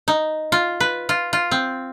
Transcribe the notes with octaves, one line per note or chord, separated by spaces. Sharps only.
D#4
F4
B4
F4
F4
C4